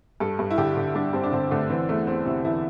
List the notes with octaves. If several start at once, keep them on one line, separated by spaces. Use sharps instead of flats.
G2 A4
G2
E4
D3 G4
D3
G2 D4
G2 C4
D4
D3 C4
D3 A3
E3 C4
E2 A3
E2 C4
C3 E4
E3 E4